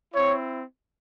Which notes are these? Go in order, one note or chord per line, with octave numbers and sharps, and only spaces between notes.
C4 E4 C#5